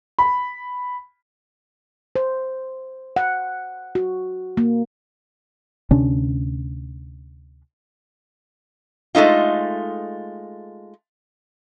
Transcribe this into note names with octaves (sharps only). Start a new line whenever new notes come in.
B5
C5
F#5
F#4
A#3
D2 C3 C#4 D4
G#3 A3 D#4 F4